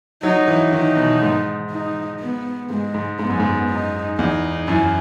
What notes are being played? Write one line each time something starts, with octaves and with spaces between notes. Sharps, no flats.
F#3 D#4
E3
D#3 D#4
B2
G#2
D#4
B3
G#2 G#3
G#2
G#2 B3
F#2
G#2
D#4
E2 D#4
F#2 E4